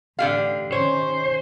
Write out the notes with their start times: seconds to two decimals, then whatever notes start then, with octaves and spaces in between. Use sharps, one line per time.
0.19 A1 D3 G4 F5
0.72 D#3 C#4 C5 C#5